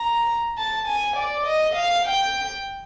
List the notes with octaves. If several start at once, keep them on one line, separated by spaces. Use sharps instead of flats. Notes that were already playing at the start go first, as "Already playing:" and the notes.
Already playing: A#5
A5
G#5
D5
D#5
F5
G5